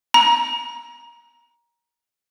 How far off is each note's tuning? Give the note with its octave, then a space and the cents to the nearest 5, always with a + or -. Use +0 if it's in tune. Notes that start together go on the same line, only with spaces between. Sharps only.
A#5 +20